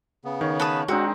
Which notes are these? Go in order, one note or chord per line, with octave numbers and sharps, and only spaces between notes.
C#3 B3
D#3 C#5
B4 A5 D#6
D#3 G#3 C4 D4 D#4 F#4